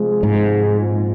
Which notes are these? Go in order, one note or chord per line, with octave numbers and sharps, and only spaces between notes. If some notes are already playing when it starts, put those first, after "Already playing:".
Already playing: C3 F3 G#3
G#2
A#2 F3 C4 F4